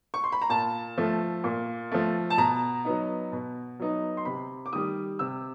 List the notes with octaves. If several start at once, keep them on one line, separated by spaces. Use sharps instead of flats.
C#6
C6
B5
A#5
A#2 A5
F3 A3
A#2
F3 A3
A5
B2 A#5
F#3 B3 D#4
B2
F#3 B3 D#4
C6
C3 B5
D6
D#3 G3 D#6
C3 E6